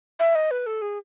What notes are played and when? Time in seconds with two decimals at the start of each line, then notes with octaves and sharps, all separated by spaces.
0.20 E5
0.35 D#5
0.51 B4
0.66 A4
0.82 G#4